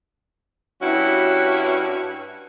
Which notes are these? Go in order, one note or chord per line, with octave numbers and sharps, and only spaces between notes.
G2 C#4 E4 F#4